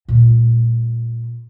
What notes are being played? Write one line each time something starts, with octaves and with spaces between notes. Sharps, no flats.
A#2 G#3